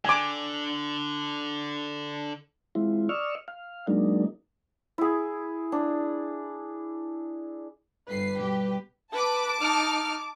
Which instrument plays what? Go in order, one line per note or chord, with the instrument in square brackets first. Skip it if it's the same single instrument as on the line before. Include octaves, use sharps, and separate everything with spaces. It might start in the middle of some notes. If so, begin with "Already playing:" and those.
[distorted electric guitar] D3 [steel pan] G#5 D6
[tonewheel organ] E3 G#3 C4 E4 F4
D5 D#5 C#6 E6 F6
F5
F#3 G#3 A#3 D4 D#4
[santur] E4 G#4
D4
[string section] G1 C7 [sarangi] B4
[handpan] B2 G3 [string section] G4
[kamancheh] B4 [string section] A5 D6
[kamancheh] D#4 F6